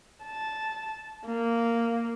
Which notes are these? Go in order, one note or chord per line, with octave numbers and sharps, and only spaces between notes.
A5
A#3